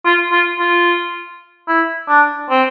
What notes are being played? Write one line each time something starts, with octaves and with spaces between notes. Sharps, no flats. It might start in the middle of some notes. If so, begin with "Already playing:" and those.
F4
F4
F4
E4
D4
C4